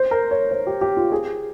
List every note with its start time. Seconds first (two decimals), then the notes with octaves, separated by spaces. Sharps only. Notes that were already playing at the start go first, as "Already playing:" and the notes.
Already playing: C5
0.11 A#4
0.31 C#5
0.51 C5
0.67 G4
0.81 G4
0.97 F4
1.12 G#4